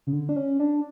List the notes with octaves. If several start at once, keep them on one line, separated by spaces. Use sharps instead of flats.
C#3
D3
D4
C#4
D4